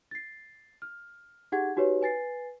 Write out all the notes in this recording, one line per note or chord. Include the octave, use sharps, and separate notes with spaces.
A6 C7
F6
D#4 G4 G#4 F#5 G#6
D#4 F#4 G4 B4 C#5
B4 G#5 A6 C7